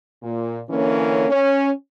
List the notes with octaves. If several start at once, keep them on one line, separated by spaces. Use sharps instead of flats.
A#2
D3 E3 A#3 C#4
C#4